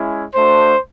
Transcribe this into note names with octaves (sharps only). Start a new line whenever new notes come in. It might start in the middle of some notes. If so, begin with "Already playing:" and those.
Already playing: G#3 C#4 E4
A3 D4 F#4 C5